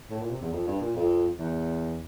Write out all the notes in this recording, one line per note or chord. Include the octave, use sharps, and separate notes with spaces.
A2
A#2
C3
E2
F2
G2
A#2
F2
E2